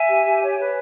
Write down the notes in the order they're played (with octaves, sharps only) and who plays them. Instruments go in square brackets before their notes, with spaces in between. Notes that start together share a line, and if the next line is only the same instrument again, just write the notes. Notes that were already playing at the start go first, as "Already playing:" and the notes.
Already playing: [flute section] E5 G#5
G4
G4
C#5
B4